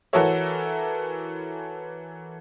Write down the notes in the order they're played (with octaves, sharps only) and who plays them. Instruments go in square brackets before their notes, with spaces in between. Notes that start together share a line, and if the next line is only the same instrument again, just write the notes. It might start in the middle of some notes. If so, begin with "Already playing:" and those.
[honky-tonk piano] E3 F#4 A4 A#4 C#5 E5